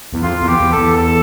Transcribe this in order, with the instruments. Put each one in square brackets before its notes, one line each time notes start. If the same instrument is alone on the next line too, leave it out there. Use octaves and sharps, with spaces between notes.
[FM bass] E2
[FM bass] F2 [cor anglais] F4
[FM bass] E2
[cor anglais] G4
[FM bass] E2
[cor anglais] A4
[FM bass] E2
[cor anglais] A4